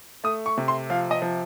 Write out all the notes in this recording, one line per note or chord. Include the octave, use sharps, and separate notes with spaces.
A3 D#6
C#6
C3
C6
F3 F5
D#5
F3